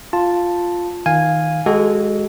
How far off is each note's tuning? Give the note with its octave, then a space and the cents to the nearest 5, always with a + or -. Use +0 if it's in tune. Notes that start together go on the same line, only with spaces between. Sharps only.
F4 +0 A5 +0
D#3 +20 F5 +5 G#5 -5
G#3 +0 F#4 +30 A4 -20